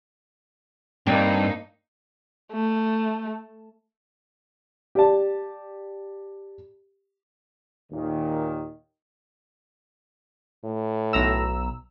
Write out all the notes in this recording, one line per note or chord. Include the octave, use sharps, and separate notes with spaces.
G2 A#3 C4 D4 D#4
A3
G4 D5 A5
D#2 A#2 D#3
A2
B1 A#5 E6